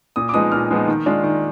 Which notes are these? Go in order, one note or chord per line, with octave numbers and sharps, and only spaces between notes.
A#2 D#6
D6
F3 G#3 B3 D#4 D#6
A#2 F6
F3 G#3 B3 D#4
D#3
G#3 D4 F4
D#3